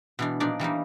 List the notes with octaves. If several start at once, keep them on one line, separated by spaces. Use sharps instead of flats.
B2 E3 D4
A#2 F3 D4 D#4 D5
E3 G3 A#3 D#4